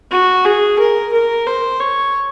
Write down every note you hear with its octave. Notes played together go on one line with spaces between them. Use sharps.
F#4
G#4
A#4
A#4
C5
C#5